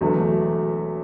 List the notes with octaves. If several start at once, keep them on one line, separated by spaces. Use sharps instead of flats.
E1 E2 D3 F#3 A3